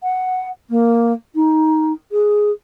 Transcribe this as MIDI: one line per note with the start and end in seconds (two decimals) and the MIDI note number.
0.02 0.48 78
0.69 1.12 58
1.35 1.92 63
2.11 2.50 68